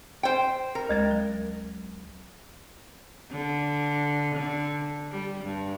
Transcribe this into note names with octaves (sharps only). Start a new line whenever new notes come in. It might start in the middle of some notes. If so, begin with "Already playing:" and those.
C5 G5
A#4
D2 G#3 A6
F#3
D3
D3
G3
G2